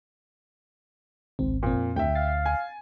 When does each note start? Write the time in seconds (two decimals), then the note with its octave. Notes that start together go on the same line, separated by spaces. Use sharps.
1.39 G#1 C#2 C4
1.63 F2 A#2 C4
1.96 D2 E5 G5
2.15 F5 A6 C7
2.46 G#5